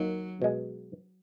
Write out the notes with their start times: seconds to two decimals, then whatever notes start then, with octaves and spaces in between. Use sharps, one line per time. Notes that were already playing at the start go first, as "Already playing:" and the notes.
Already playing: D#2 D#3 F#3 A#3 D#4
0.42 B2 G#3